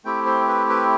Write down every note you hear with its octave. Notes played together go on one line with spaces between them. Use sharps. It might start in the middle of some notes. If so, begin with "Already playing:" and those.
A3 C4 E4 G4 G5
C5
B4
B4